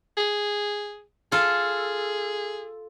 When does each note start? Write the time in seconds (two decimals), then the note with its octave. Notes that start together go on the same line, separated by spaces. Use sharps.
0.17 G#4
1.32 F4 G#4 A4